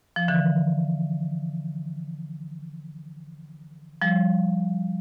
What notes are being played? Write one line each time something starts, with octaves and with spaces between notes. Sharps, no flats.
F3
D3 E3
F3 G3